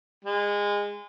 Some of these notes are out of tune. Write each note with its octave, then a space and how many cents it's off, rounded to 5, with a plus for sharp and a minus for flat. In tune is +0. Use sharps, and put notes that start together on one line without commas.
G#3 -25